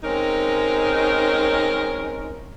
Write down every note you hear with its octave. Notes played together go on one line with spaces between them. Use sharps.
G#3 C4 C#4 D#4 A#4